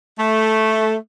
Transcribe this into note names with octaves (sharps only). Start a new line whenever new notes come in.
A3